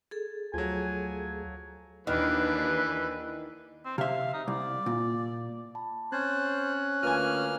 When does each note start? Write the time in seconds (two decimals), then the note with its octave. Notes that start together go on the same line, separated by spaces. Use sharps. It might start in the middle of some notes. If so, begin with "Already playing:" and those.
0.11 G#4 A4
0.54 D2 F3 F#3 G#5
2.07 D#2 D#3 E3 D4 B4
3.85 C4
3.98 C3 E5 F5
4.34 D#4
4.48 C2 D5
4.86 A#2
5.75 A5 B5
6.12 C4 C#4 C5 F#6 G#6 A6
7.03 D2 A#3 F4 B4 D#5 G#5 F6